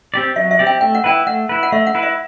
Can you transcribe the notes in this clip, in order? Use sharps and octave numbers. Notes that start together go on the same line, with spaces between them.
C4 G4 D5
F#3 E5
E5
C4 G4 D5
G5
A3 G5
F#5
E4 B4 G5
A3 F#5
E4 B4
F#5
A3 E5
F#5
E4 B4
E5